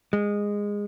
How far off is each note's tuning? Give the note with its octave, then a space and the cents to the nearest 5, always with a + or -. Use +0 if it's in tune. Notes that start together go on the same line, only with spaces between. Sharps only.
G#3 -15